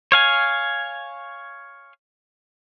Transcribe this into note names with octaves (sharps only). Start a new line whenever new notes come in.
C#5 F5 G#5